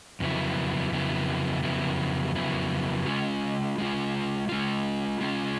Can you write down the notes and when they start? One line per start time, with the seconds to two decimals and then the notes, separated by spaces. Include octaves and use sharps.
0.20 F2 C#3 F#3 B3 E4
0.92 F2 C#3 F#3 B3 E4
1.63 F2 C#3 F#3 B3 E4
2.36 F2 C#3 F#3 B3 E4
3.06 G#3 C#4 F4
3.78 G#3 C#4 F4
4.49 G#3 C#4 F4
5.21 G#3 C#4 F4